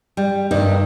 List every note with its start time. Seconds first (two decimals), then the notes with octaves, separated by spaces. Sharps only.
0.17 G3
0.51 G2 C3 D#3